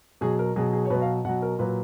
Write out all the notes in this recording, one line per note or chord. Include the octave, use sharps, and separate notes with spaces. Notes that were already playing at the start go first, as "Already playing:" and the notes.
B2 F#3 G#4
A#4
B2 F#3 G#4
G#4
C#5
B2 F#3 B4
F5
B2 F#3 F#5
A#4
A#2 F#3 B4